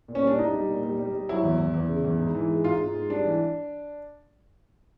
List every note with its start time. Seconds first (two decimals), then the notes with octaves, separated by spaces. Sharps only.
0.08 A#2
0.15 C#4
0.23 G3 D4
0.38 G3 D#4
0.54 G3
0.69 A#2
0.83 G3
0.99 G3
1.13 G3
1.29 F#3 E4
1.43 E2
1.58 E2
1.74 E2
1.89 C#3
2.04 E2
2.20 G#2
2.35 E3
2.50 G#3
2.64 G#2 F4
2.80 G#2
2.95 G#3
3.10 G3 D4
3.25 E3